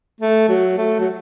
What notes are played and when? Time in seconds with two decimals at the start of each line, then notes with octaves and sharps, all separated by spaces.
0.21 A3
0.49 F#3
0.78 A3
1.00 F#3